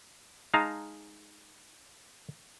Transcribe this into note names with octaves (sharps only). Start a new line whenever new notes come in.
G#3 D#4 F5 A5 A#5